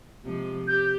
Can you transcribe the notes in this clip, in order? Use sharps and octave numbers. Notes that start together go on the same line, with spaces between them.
C3 F3 G#3
G4 G6